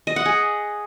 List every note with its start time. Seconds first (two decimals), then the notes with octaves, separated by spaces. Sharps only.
0.07 D#5
0.16 F#5
0.26 G#4